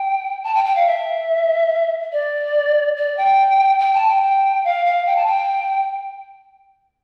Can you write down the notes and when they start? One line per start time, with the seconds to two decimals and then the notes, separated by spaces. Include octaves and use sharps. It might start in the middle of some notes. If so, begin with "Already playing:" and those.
Already playing: G5
0.44 A5
0.55 G5
0.65 G5
0.76 F5
0.87 E5
2.13 D5
2.97 D5
3.17 G5
3.80 G5
3.94 A5
4.08 G5
4.23 G5
4.65 F5
4.85 F5
5.06 G5
5.16 A5
5.26 G5